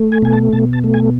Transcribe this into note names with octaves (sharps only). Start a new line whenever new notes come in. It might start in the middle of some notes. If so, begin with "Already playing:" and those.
Already playing: A3
G#5
B2 G#5
A5
B2 A5
A5
A3
G#5